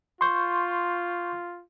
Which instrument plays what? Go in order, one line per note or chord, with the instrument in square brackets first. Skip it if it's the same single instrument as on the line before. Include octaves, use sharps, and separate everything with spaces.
[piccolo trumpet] F4 [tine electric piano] C6 C#6 G6